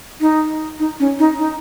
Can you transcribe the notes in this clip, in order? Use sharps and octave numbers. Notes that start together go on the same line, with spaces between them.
D#4
D#4
C#4
D#4
D#4